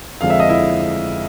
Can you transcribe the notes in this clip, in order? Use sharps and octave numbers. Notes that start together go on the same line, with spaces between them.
F2 D3 F3 G#3 F5
E5
D#5
E4 E5